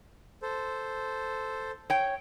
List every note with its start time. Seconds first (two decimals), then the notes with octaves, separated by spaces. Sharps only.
0.42 A4 C5
1.90 C#5 G5